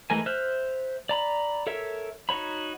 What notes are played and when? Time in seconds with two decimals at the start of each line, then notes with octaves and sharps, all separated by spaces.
0.10 E3 G#3 A3 A#4 G#5
0.26 C5 E5 F6 F#6
1.09 D5 A#5 B5
1.67 A4 A#4 C#5 E5
2.29 D#4 F#4 C#5 B5